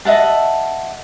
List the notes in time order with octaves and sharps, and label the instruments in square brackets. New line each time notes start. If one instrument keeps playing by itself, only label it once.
[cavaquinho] D#5 E5 F#5 A5